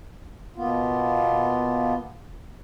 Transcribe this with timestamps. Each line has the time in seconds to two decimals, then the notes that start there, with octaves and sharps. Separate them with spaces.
0.56 B2 A#3 B3 F4